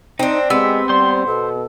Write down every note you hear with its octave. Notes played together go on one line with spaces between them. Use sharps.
C4 D4 D#4
G#3 B3 C4 G4 E6
G3 C5 C6
B2 A4